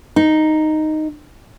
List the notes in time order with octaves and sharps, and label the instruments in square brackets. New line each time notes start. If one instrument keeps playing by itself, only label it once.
[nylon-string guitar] D#4